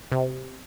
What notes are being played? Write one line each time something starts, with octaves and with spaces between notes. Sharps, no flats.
C3